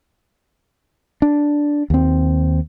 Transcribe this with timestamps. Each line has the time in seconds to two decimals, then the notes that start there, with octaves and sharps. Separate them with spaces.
1.22 D4
1.90 D#2 C4